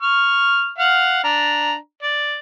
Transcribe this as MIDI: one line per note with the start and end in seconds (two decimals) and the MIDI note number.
0.02 0.70 85
0.02 0.70 89
0.78 1.21 77
0.78 1.21 78
0.78 1.21 89
1.24 1.75 62
1.24 1.75 82
2.03 2.38 74